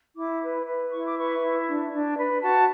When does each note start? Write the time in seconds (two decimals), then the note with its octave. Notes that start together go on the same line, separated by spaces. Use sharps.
0.17 E4 D6
0.42 B4
0.67 B4
0.92 E4 C#6
1.05 D6
1.16 B4 C#6
1.41 E4
1.66 D4
1.92 D4
2.17 B4
2.42 F#4 A5